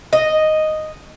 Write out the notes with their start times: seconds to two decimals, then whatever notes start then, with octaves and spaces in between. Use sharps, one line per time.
0.13 D#5